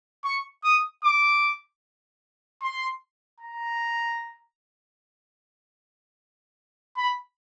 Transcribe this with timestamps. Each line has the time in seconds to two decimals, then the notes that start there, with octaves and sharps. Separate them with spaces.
0.24 C#6
0.64 D#6
1.04 D6
2.62 C6
3.40 A#5
6.97 B5